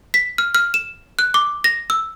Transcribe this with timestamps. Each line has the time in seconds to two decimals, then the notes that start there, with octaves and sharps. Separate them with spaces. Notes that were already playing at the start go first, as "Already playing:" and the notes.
0.14 B6
0.38 F6
0.55 F6
0.74 E7
1.19 F#6
1.34 D6
1.64 A#6
1.90 E6